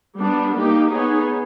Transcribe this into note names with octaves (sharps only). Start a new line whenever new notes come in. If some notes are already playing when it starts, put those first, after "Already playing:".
G3 B3 D4
A#3 D#4 G4
B3 D#4 G#4 C#5